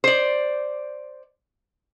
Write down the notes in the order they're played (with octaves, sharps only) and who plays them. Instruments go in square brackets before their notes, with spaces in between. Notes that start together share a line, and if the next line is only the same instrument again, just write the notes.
[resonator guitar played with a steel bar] C5 D5